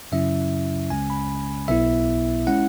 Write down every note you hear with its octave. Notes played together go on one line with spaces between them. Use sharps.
F#2 C#3 F#3 C#4 E4 E5
C#2 C#3 G#3 C#4 G#5
B5
B1 B2 B3 E4 E5
G#3 C#4 E4 F#5